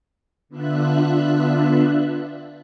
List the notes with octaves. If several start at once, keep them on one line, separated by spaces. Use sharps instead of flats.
D3 B3 D4 F4 E5 F#6